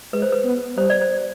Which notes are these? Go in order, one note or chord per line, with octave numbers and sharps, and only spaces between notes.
G#3 B4
C5
B4
B3
G3 C5
D5
C5